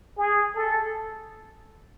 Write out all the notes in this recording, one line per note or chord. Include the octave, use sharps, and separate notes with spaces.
G#4
A4